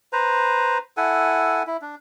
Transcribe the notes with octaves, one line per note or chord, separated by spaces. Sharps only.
B4 C5 A#5
E4 A4 F#5 G#5
E4
D4